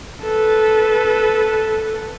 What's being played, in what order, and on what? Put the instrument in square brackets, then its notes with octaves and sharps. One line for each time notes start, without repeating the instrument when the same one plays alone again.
[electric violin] A4 B4